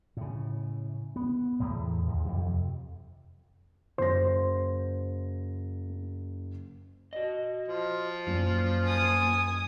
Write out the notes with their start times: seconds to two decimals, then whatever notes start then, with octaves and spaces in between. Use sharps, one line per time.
0.17 A2 C#3
1.16 B3
1.60 E2 A2
2.08 D#2
2.25 F2 C3
3.98 F#1 C5 A#6
7.13 F#4 D#5
7.68 F3
8.27 F#2 A#3 F4
8.84 G#5 D#6